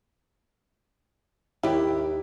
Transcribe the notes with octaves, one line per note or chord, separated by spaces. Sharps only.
D#2 E4 G4